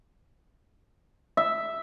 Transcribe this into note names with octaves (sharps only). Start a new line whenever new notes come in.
E5